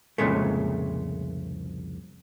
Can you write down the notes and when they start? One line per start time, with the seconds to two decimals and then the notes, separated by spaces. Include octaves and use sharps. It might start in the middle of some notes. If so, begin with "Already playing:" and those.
0.18 C2 F2 A#2 C#3 G#3 A3